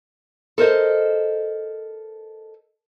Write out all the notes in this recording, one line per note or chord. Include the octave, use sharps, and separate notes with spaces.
A4 A#4 C5 D#5